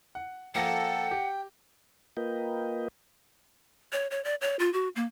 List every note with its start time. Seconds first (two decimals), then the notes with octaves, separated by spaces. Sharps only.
0.15 F#5
0.55 F3 A#3 A4 F#5 G5 A#6
1.11 G4
2.17 A#3 F4 A#4 B4 D#5 G5
3.92 C#5
4.11 C#5
4.24 D5
4.41 C#5
4.59 F4
4.73 F#4
4.96 A#3